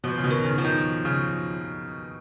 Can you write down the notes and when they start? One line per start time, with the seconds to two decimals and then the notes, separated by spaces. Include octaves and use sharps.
0.04 B2 F3
0.18 C#3
0.24 B2
0.30 D#3
0.44 C#3
0.58 F3
0.64 D#3
1.05 C#3